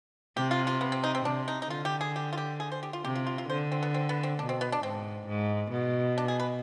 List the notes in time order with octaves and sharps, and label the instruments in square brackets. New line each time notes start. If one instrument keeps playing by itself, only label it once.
[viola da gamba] C3 [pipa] G4
[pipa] F4
F4
B3
C4
D#4
C4
[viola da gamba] C3 [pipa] D4
[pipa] D#4
D#4
[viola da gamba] D3 [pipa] F4
[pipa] G4
G#4
G4
F4
G4
G#4
C5
G4
F4
[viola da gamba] C3 [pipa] G4
[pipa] F4
F4
F4
[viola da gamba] D3 [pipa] C5
[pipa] C4
B3
C4
B3
C4
[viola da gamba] B2 [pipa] D4
[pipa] C4
B3
D4
[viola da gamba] G#2 [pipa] C4
[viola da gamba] G#2
B2
[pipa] D4
G#4
B4